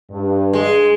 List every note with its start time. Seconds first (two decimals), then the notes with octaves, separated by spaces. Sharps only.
0.11 G2
0.53 G#3